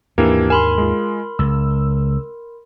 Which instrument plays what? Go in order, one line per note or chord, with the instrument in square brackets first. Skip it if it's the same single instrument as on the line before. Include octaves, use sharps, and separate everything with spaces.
[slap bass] D#2 G#2 [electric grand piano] E3 A#3 [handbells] D4 G4
[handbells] A#4 B5 C6 [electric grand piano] G#5
[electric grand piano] G#3 F4
[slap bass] C#2 [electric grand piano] E6